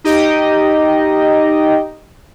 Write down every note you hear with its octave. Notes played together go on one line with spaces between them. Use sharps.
D#4 G4 D#5